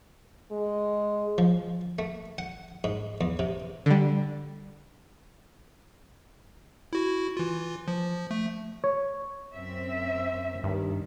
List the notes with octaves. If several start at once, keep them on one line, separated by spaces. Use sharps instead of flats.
G#3
F3
A3
F#5
G#2
E2
C3
D3 G3
E4 F#4
E3 F4
F3
A3
C#5
F#2 C4 E5
G2 D#3